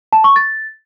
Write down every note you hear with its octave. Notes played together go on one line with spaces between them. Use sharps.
A5
C#6
A6